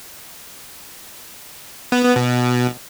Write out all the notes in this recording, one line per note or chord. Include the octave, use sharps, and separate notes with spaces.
B3
B3
B2